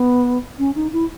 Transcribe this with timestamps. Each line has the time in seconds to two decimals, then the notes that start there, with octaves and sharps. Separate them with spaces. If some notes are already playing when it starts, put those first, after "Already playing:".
Already playing: B3
0.59 C#4
0.76 D#4
0.93 E4